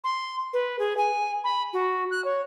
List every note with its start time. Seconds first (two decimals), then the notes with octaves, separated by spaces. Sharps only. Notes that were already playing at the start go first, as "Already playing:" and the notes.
0.04 C6
0.53 B4
0.79 G#4
0.97 G#5
1.44 B5
1.73 F#4
2.11 F#6
2.24 C#5